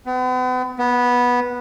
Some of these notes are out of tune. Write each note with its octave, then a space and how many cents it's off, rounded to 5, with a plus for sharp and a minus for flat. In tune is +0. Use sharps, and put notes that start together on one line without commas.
B3 +40
B3 -10